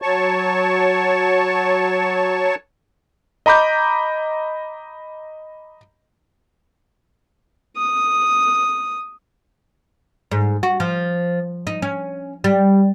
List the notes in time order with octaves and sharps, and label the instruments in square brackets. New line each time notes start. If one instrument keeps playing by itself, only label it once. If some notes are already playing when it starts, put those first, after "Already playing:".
[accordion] F#3 C#5 A5 C#6
[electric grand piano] D#5 A#5 B5 D6 G6
[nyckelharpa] D#6
[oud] G#2
F#4
F3
D#4
C#4
G3